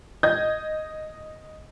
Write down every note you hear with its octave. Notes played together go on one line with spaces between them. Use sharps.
D#5 G6 G#6